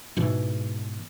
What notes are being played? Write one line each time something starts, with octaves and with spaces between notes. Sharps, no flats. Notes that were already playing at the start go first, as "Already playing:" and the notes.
G#2 B2 E3